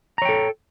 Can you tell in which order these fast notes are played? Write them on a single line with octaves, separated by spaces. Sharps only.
A#5 C#5 G5 A4